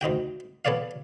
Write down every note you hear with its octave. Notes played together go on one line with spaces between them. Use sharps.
D2 D#4 F#4 G5
B3 A4 C#5 D5 F5